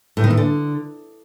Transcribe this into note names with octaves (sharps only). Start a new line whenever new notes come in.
A2
D#3
A2
D3